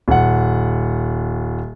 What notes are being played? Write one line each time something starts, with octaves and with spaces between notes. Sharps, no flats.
D#1 F#5